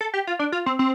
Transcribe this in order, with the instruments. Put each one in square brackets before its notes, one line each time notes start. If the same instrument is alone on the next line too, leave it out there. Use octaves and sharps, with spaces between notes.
[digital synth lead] A4
G4
F4
D4
F4
C4
C4